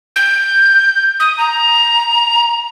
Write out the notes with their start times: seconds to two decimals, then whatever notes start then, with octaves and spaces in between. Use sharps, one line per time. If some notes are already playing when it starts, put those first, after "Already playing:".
0.16 G6
1.20 D#6
1.38 A#5